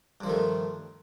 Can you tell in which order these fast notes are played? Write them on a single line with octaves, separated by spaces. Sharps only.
G2 F3 D#3 A3